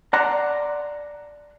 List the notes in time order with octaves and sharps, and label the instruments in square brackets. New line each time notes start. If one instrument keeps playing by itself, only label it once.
[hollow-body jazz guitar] D5 F#5 A5 A#5 C6